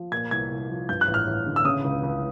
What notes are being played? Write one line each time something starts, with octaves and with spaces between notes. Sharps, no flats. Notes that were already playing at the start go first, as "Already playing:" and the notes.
Already playing: F3
A#2 G#6
C2 G#6
C2
F3
G2 G6
F#6
A1
F6
A1
D3
E6
C#3 D#6
C#2
C#2